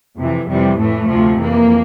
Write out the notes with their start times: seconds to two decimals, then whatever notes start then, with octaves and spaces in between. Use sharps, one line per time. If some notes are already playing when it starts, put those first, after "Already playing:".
0.18 F2 C3 E3
0.48 F2 C3 E3 G3
0.78 A2 E3 A3
1.09 D2 C3 F3
1.40 F2 E3 A#3